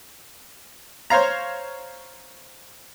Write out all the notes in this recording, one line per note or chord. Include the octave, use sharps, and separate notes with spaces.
C5 C#5 F5 A#5